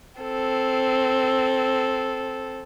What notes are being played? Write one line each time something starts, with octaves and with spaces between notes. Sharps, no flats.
C4 A4